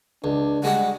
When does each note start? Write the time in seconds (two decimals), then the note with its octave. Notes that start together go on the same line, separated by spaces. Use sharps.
0.24 C#2 D4
0.64 G3 G#3 F#5